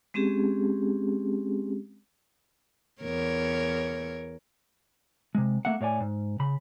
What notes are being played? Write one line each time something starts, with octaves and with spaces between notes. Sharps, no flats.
G#3 C4 C#4 G4 G#4
E2 A#4 C#5
C3 G#3
A3 A#3 E5 F#5
A2 C#5 D5 G#5
G#2
C#3 B5